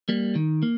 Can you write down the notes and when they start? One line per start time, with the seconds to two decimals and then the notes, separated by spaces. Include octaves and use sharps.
0.09 G3 A#3
0.35 D#3
0.63 A#3